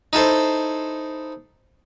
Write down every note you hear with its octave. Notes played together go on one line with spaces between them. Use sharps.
D#4 E4 A4 C5